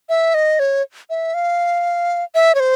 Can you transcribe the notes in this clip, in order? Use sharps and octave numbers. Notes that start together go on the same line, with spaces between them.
E5
D#5
C#5
E5
F5
E5
C#5
C5